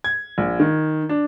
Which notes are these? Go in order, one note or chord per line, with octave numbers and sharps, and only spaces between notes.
G#6
A#1
D#3
D4